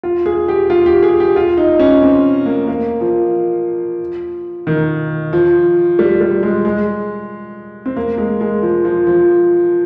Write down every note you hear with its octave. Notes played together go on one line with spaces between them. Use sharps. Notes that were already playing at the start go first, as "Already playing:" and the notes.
F4
G#4
G4
F4
G4
G#4
G4
F4
D#4
C#4
C4
A#3
A#3
F3
D#3
F3
G3
G3
G#3
G#3
C4
A#3
G#3
G#3
F3
F3
F3